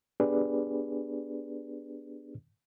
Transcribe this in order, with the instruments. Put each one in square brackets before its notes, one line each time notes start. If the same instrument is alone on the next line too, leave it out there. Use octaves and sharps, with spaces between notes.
[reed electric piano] B3 D4 G4 G#4 B4 D5